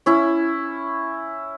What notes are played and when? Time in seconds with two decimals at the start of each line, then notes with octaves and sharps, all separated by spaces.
0.06 C#4 E4